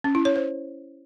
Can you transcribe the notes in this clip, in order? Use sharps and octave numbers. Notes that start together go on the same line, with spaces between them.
C#4
E4
C#5
C5